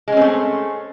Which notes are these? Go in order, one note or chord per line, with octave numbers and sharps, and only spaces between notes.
G#3 A3 C4 C#4